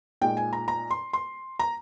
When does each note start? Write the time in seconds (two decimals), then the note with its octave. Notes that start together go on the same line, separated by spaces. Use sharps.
0.21 A#2 G#3 D#4 G5
0.37 G#5
0.53 A#5
0.68 A#5
0.91 C6
1.13 C6
1.59 A#5